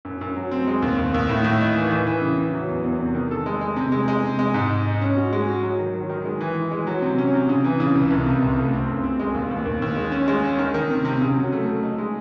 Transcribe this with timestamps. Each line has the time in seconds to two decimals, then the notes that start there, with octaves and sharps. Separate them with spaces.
0.05 F#2
0.21 F#2
0.36 F#3
0.51 C4
0.67 G#3
0.82 D#2
0.98 D#2
1.14 D#2
1.29 A2
1.44 A2
1.60 D#4
1.76 E3
1.91 E3
2.07 E3
2.22 C#3
2.37 E3
2.54 F#3
2.69 E2
2.84 E2
2.99 C3
3.15 D#3
3.31 A4
3.46 G#3
3.61 G#3
3.76 C3
3.92 G#3
4.08 G#3
4.24 C3
4.39 G#3
4.54 G#2
4.70 D#4
4.86 D#4
5.01 C#4
5.17 F#4
5.33 G#3
5.48 F#4
5.63 F#3
5.79 D#3
5.94 F#3
6.10 D#3
6.25 G#3
6.41 E3
6.57 E3
6.71 G#3
6.87 F#3
7.02 C3
7.18 C#4
7.34 C3
7.49 C#3
7.64 E3
7.80 C#3
7.95 C#2
8.10 C2
8.26 C3
8.42 C2
8.57 A3
8.73 C4
8.88 F#2
9.03 C4
9.19 G#3
9.34 D#2
9.51 D#2
9.65 D#2
9.82 D#2
9.96 G#3
10.12 C#4
10.28 G#3
10.44 C#4
10.59 D#3
10.74 D#3
10.90 C3
11.05 C3
11.21 C#3
11.36 F#3
11.52 A3
11.67 A3
11.83 D#4
11.98 G#3